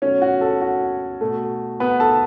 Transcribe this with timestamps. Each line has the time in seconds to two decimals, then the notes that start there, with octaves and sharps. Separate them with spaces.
0.02 B2 F#3 A3 C#4 C#5
0.22 F#4 F#5
0.41 A4
0.61 F#4
1.21 B2 A3
1.80 B3 B4
2.00 A4 A5